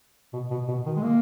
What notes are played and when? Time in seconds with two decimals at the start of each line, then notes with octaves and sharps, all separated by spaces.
0.33 B2
0.51 B2
0.68 B2
0.86 D#3
0.96 G#3
1.03 A#3